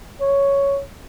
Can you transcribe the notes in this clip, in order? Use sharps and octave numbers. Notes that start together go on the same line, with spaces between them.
C#5